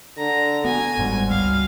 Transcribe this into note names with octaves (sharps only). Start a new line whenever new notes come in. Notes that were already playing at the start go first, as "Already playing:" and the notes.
D3 A#5
B3 F#4 G#5
G1 G#2 G3
C#2 G3 F5